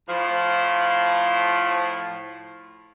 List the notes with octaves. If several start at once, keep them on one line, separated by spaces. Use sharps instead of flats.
A2 F3